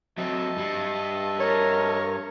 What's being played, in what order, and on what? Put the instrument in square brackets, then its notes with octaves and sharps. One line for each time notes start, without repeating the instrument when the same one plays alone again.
[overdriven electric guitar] F#3 C4 [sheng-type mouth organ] D#5 E5 A5
[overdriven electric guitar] G2 G3
[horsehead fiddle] A#4 [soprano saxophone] C#5